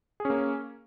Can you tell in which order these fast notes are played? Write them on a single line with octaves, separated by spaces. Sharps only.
G#4 C#4 A#3